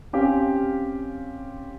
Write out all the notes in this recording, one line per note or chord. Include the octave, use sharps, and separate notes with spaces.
C4 C#4 G4 F5